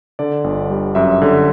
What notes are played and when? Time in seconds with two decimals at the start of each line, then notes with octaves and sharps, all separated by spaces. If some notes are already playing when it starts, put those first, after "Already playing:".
0.19 D3 D5
0.44 G1
0.70 G3
0.95 F#2 E5
1.22 D3